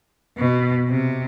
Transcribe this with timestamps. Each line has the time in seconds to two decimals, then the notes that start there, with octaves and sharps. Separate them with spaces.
0.38 B2
0.88 C3